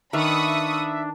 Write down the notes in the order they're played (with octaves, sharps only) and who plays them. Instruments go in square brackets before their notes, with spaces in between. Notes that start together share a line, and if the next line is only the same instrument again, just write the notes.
[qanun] D#3 B4 F5 [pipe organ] D4 [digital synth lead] E5 [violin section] B5 C#6 D#6